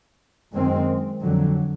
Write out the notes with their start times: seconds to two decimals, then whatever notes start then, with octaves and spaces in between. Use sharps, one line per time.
0.51 F#2 D#3 G#3 C4
1.19 F2 D3 F#3